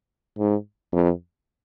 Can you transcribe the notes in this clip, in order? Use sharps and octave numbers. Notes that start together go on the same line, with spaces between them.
G#2
F2